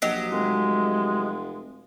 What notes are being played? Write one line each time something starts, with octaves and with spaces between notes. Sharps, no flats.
A#1 F#3 G4 D#5
F1 G#3